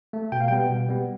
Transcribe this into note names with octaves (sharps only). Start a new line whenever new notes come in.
A3
B2 G5
F5
G3 B3 G5
B2
G3 B3